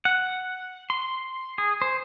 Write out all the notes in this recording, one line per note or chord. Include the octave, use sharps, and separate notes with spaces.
F#5
C6
G#4
C5